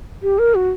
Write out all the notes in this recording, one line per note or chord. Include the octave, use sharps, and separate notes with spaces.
G4
A#4
F#4